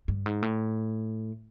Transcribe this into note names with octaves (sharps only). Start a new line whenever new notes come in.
G2
G#2
A2